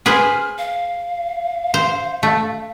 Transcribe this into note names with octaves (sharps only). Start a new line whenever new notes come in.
G#4 B4 C5 F6
F5
C5
A3